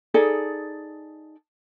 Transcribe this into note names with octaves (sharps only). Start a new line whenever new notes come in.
D#4 G#4 A4 D5